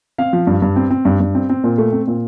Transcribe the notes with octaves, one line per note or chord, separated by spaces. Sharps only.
C4 F5
F3
G2
G2
C4
C4
G2
G2
C4
C4
A#2
A3
C4
A#2